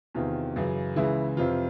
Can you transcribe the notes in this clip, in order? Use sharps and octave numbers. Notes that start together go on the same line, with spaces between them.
E2 C3 D#3 F4
F#2 C#3 E3
C#2 C#3 E3 E4
F2 C3 E3 F4